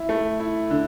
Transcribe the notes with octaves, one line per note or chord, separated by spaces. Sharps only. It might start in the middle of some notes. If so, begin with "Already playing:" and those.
Already playing: E4
A3
E4
D3